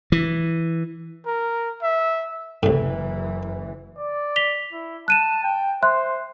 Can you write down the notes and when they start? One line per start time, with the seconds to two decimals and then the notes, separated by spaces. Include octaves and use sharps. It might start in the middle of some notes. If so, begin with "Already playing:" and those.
0.12 E3
1.26 A#4
1.82 E5
2.63 F#1 C2 A2 E3
3.98 D5
4.36 B6 F7 G7
4.72 E4
5.08 A5 F#6 D#7 E7
5.43 G5
5.82 C5 E5 C6 F#6